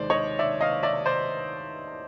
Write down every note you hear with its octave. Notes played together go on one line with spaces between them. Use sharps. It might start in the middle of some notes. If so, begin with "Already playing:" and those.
Already playing: D#2 D#3 G#3 C5 D5
C#5 D#5
D5 E5
D#5 F5
D5 E5
C5 D5